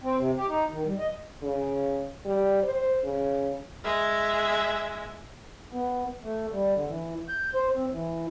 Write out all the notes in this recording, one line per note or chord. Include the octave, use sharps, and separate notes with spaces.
C4
C3
G4
D#4
D#3
G3
D#5
C#3
G3
C5
C#3
G#3 E5
B3
A3
G3
D3
E3
G6
C5
C4
E3